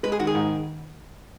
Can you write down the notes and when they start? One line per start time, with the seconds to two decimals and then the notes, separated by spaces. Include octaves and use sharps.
0.03 G#3 B4
0.12 G#4
0.19 D#3 F#4
0.27 G#4
0.35 G#2